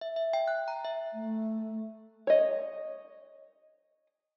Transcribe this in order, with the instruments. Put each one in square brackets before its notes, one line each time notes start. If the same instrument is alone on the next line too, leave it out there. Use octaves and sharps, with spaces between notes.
[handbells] E5
E5
G5
F#6
A#5
E5
[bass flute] A3
[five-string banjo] C#5 D#5